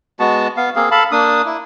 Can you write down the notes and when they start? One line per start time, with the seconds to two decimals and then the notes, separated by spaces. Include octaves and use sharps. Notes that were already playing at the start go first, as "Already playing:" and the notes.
0.20 G#3 B3 F#4 A5
0.57 B3 F5
0.76 A#3 C4 G#4 F5
0.91 A4 F5 A5 B5
1.12 A#3 D4 D#6
1.46 E4